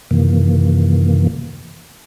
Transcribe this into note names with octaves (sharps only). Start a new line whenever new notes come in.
F#2 C3 D#3 E3 A#3